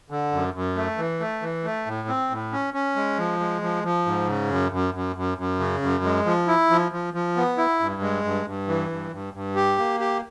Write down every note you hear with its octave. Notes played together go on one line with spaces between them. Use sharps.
D3
F#2
F#2
A3
E3
A3
E3
A3
A2
C4
A2
C#4
C#4
G#3
F3
G#3
F3
F3
G#2
C#3
F#2
F#2
F#2
F#2
F#2
C#3
F#2
G#3
F3
E4
F3
F3
F3
B3
E4
G2
G#3
G2
G2
E3
G2
G2
G2
G4
A#3
G4